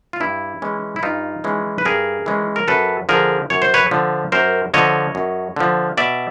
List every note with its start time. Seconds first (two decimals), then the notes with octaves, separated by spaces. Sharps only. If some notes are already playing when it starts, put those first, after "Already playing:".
0.13 F4
0.20 G2 E4
0.62 E3 G#3 C#4
0.96 E4
1.03 G2 D#4 F4
1.44 E3 G#3 C#4
1.78 B4
1.85 G2 G#4 A#4
2.26 E3 G#3 C#4
2.56 A#4
2.68 F#2 A4 B4
3.09 D3 F3 G#4 A#4
3.50 F#2 C#5
3.62 C5
3.74 B4 C#5
3.91 D3 F3
4.32 F#2 A#4 C5
4.74 D3 F3 C#5 D#5
5.15 F#2
5.56 D3 F3
5.97 B2 D5 E5